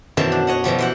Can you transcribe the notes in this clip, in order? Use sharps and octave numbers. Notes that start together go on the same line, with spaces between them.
F#2 B2 D#3 E3 C5 A5
D4
C#5 D#5 F#5
B2 E3 F3 G3
E3 C5 F#5